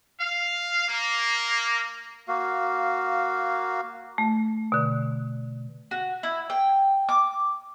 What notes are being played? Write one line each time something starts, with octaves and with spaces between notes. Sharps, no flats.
F5
A#3
A#3 F#4 F5
A3
B2 D3
F#4
E4
G5
D6